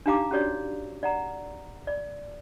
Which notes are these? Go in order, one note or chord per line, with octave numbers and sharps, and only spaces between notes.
D4 D#4 G4 F5 A#5 D6
C#4 F#4 G4 C#5 D5
D5 F#5 A#5
D5